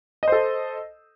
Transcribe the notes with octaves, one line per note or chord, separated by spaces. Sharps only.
A4 C5 D#5